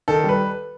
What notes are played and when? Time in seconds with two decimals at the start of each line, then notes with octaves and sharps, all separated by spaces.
0.08 D#3 A4
0.24 G3 B4